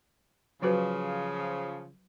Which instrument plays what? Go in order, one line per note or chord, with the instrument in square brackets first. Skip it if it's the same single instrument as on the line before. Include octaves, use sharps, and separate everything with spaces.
[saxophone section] C#3 F3 [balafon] F#3 F#4 B4